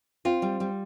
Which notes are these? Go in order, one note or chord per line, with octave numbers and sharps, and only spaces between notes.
C4 F4
G3
G3